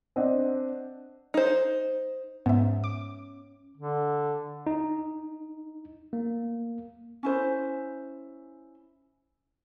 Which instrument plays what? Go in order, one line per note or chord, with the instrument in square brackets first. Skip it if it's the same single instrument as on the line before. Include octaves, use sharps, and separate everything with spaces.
[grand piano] C4 D4 D#5 F#5
[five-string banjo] D#4 C5
[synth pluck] G#2 [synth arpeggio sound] B3 E5 [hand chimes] C#4
[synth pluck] D6
[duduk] D3
[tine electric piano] D#4
A#3
[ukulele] C#4 E4 C5